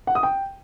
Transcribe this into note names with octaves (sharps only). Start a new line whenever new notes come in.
F#5
D#6
G5